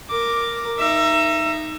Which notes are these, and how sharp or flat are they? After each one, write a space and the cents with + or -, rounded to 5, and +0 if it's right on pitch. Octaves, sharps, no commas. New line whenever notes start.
A#4 +0 D6 +0
D#4 +0 E5 +25